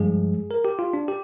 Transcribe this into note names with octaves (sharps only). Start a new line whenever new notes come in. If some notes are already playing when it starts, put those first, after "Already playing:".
Already playing: G2 F3 G#3 G#4
A#4
G4
F4
D4
G4